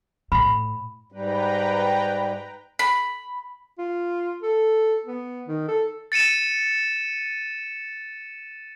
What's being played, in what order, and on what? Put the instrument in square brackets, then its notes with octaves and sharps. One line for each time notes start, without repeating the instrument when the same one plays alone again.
[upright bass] A2 [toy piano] B5
[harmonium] G#2 G3 [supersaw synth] B4 G5 A#5
[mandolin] B5
[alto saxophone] F4
A4
B3
D#3
A4
[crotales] A6 C#7 D#7 E7